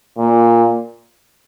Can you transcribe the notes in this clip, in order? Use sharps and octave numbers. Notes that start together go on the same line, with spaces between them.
A#2